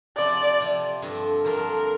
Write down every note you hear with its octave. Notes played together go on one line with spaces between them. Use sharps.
C3 F3 C4 D5
C3 F3 C4
G2 D3 F3 C4
G2 D3 F3 C4 A#4